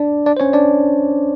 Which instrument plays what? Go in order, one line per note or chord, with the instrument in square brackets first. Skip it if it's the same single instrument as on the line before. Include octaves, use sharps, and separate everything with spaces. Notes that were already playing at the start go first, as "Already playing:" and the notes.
Already playing: [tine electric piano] D4 D5
D4 D5
C5
C#4 C#5
D4 D5